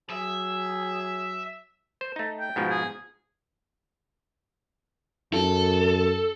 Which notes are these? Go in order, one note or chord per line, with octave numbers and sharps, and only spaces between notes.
F#3 G#4 E5
C5
A3 D#4
G5
G#2 B2 F3
G#4
F#2 A4